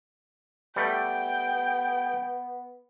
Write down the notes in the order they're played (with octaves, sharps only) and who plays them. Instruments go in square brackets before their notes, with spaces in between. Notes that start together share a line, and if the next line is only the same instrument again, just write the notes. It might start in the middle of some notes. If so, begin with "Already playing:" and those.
[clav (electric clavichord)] G3 A3 [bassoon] B3 [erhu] G5